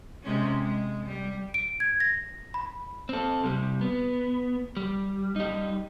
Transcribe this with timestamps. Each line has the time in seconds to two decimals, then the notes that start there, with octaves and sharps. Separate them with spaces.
0.24 C3 G#3 C#4
0.62 G#3
1.06 G3
1.54 D7
1.80 G#6
2.00 A#6
2.54 B5
3.09 C4 A4
3.44 C3 G3
3.81 B3
4.77 G3
5.36 G3 D#4